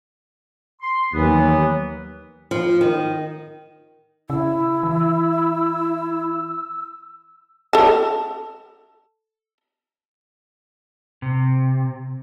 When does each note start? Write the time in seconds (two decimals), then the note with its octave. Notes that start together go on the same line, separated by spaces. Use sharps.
0.81 C6
1.13 D#2 E3 F#3 B3
2.51 F3
2.81 D#3
4.30 C#3 E4 E6
4.83 E3
7.73 A4 A5
11.22 C3